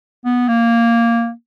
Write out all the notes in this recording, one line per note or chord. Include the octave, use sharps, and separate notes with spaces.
B3
A#3